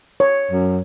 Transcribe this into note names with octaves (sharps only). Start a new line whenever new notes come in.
C#5
F#2